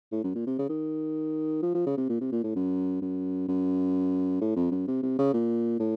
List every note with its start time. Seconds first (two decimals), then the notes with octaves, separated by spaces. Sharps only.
0.12 A2
0.24 F#2
0.35 A#2
0.47 C3
0.59 C#3
0.70 D#3
1.62 F3
1.74 F3
1.86 C#3
1.97 C3
2.09 A#2
2.21 C3
2.32 A#2
2.43 A2
2.55 F#2
3.02 F#2
3.48 F#2
4.41 A2
4.56 F2
4.71 F#2
4.87 C3
5.03 C3
5.18 C#3
5.33 A#2
5.79 A2